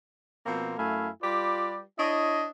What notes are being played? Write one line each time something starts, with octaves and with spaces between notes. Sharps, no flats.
B2 F3 A#3 C4
F#2 A3 E4 F5 G#5
G3 F4 G4 B4 D5
D4 E4 C#5 D#5